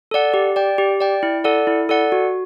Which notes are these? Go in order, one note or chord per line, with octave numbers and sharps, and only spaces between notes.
A4 D5 F#5
G4
D5 G5
G4
D5 G5
E4
A4 D5 F#5
E4
A4 D5 F#5
F#4